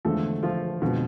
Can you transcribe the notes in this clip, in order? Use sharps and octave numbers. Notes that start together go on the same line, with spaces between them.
E2 D3 F3 G#3 A3 A4
F3 F4
F2 B2 D3 F3 G#3 B3